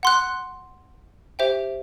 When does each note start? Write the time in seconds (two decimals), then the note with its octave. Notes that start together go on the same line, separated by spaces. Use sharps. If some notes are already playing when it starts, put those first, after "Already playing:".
0.03 F#5 C6 F#6
1.39 G4 C5 E5 G5